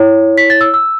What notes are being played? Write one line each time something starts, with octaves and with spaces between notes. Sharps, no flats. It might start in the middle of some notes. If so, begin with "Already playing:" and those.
Already playing: E4 C#5
B6
A6
E6
E6